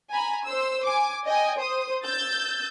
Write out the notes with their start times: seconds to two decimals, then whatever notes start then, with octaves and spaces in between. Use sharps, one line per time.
0.11 G#5 A#5 B5
0.46 C5 E6
0.85 G#5 D6
1.26 D#5 G5 G#5
1.59 C5 D#6
2.05 E6 G6 A6